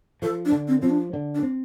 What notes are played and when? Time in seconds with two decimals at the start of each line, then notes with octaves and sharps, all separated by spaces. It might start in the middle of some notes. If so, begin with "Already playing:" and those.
0.22 F3 A4
0.45 D4
0.52 D3
0.68 C4
0.82 F3 C4
0.90 D4
1.13 D3
1.35 D4
1.42 C4